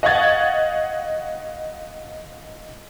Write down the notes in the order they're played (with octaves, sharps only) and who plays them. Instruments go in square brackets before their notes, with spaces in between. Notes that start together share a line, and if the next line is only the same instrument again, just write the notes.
[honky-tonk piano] D#5 F5 F#5 C#6 G#6 A6